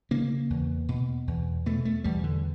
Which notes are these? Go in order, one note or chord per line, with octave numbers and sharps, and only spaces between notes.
C#3 A#3
E2
B2
E2
B2 A3
A3
E2 G3
D3